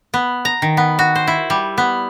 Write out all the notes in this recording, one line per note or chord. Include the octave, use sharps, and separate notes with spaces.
B3
A#5
D#3
B3
F#4
C5
E4
G3
B3